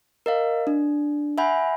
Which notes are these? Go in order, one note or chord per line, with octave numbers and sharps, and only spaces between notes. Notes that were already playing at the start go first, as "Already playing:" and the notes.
A#4 D#5 F5
D4
E5 F#5 G#5 B5 G6